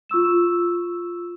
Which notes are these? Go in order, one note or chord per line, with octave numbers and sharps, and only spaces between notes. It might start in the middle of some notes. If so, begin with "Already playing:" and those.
F4 C#6 E6 E7